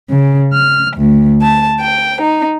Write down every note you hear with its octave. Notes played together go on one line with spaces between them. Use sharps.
C#3
F6
D2
A5
G5
D#4